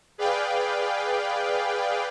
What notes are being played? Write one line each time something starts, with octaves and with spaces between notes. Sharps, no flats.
G#4 B4 D5 F5 G5